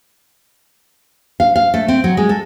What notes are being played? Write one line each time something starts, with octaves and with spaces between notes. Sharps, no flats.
F5
F5
A3
C4
F#3
G#3
A4